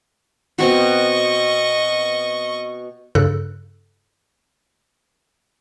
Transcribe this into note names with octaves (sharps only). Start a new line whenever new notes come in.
B2 C4 F#4 D#5 C#6
G2 C#3 A4 F#6